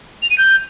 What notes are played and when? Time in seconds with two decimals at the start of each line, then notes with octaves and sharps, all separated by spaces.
0.22 F7
0.30 D#7
0.38 G6